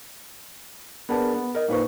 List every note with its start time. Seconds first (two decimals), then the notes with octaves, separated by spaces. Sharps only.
1.09 B3 D4 G#4 A#4 B4 A5
1.34 B3
1.55 A#4 D#5
1.68 A#2 A#3 D#4 B4 C5 C#6